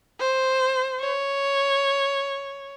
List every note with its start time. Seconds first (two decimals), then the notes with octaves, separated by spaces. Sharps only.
0.20 C5
1.00 C#5